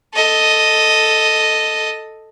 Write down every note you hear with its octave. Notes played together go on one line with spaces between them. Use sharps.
A4 D#5